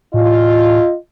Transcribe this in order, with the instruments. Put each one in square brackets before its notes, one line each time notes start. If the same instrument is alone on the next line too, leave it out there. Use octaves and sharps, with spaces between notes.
[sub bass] A2 [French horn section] F4 D#5